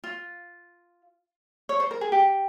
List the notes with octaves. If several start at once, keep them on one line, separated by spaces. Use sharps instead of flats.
F4
C#5
C5
A#4
G#4
G4